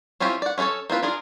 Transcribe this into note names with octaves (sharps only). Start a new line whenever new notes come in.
C4 C#4 E4 F4 G4
D5 F#5
C#4 E4 F4 A4 C#5
A#3 C4 F4 B4
D4 F4 G#4 A#4